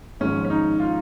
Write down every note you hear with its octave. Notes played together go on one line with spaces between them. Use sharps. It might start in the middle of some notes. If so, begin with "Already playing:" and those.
G#1 G#2 F3 G#3 C#4
C#4
D#4
F4